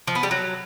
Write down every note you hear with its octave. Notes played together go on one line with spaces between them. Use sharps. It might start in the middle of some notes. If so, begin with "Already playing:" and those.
F3
B3
G3
F#3